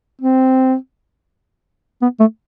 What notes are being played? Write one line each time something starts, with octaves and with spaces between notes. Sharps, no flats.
C4
B3
A3